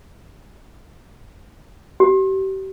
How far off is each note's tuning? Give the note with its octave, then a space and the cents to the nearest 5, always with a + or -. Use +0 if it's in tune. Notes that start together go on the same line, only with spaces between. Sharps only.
G4 -35